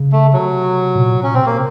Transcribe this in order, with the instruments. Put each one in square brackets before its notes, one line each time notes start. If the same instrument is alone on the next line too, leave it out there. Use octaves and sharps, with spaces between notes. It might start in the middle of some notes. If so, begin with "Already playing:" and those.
Already playing: [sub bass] C#3
[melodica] A3
[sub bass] C3 [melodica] F#3
[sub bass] A#2
A#2
[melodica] C#4
[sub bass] C3 [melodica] C4
[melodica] A#3